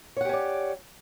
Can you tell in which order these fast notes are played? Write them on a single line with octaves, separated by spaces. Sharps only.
C#5 F#5 G4 C#4 D5